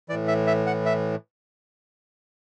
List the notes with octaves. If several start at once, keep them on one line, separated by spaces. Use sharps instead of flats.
A2 E3 D5
E5
E5
F#5
E5